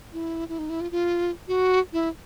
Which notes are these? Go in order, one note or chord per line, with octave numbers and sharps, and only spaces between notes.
E4
E4
D#4
E4
F4
F4
F#4
E4